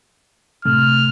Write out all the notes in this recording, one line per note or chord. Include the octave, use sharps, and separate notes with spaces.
A2 C3 A3 F6